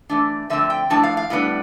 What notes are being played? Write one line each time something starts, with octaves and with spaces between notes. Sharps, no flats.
E3 A3 D4
D3 F3 A3 C4 E5
G5
A2 F3 A3 D4 A5
F5
F5
A2 G3 B3 D4